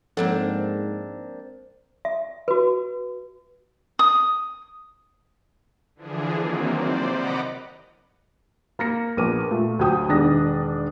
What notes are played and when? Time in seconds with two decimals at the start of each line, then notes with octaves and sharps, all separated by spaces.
0.17 G#2 F3 A#3 C4 D4 A4 F#5
2.05 E5
2.48 F#4 B4
3.99 D#6
5.96 D3 E3 F3 D4 G#4
6.33 D#3 E3 F#3 A#3 C4
6.72 C3 C5 D5
7.08 D#5 F#5 A#5 B5 D6
8.79 A#3 A#6 C#7
9.17 A#1 B3 A#4 D6 D#7
9.51 A#2 A3
9.79 D2 F#3 G4 G5 D#6
10.08 E1 D#3 D4 A#6